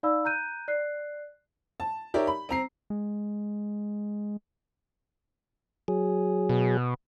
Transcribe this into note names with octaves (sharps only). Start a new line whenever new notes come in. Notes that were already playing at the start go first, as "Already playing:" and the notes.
D#4 D5 F5 B5 E6
A#5 F#6 G6 D#7
D5 F#6 C7
A5
D#4 G4 A#4 C#5 D5 E5
B5
C4 A#5 C7
G#3
F#3 G#4
B2